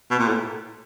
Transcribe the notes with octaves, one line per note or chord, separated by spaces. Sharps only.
B2
A#2
A2